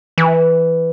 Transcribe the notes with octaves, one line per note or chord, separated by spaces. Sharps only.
E3